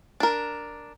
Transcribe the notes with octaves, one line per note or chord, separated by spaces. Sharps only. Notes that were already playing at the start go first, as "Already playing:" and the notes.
D4 A#4